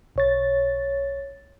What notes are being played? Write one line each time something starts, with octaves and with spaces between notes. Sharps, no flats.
B1 C#5 A6